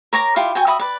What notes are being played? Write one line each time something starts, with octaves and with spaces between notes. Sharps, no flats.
A#4 C#5 A#5 D6
E4 F4 G4
F#4 G5 G#5
F#4 E5 B5 D#6
B4 D5